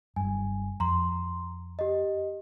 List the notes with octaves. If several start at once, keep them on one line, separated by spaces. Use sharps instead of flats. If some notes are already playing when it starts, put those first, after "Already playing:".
F#1 G2 G#5
F2 A#5 C6
G4 D#5